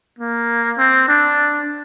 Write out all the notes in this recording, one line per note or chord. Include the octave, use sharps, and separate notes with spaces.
A#3
C4
D4